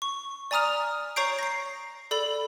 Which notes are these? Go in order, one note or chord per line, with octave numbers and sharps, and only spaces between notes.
C#6
D5 G#5 A#5 D#6 F6 F7
C#5 A#5 C#6 G6 C7 D7
A#6 C7
A4 D5 B5 F#7